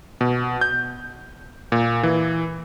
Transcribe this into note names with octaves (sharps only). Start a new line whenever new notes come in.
B2
G6
A#2
E3